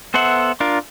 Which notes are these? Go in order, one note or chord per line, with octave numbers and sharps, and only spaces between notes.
B3 A4 C5 E5 F#5
D4 F4 A#4